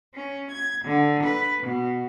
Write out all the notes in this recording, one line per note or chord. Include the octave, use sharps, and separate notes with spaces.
C#4
G#6
D3
B4
B2